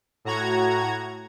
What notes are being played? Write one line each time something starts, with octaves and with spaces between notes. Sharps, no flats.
A2 F#4 A#5 G#6